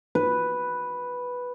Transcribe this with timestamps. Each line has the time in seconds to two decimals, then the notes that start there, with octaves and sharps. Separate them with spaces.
0.15 B4